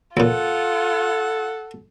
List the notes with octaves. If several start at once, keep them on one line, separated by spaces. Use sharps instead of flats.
C#2 A#2 F4 A4 F#5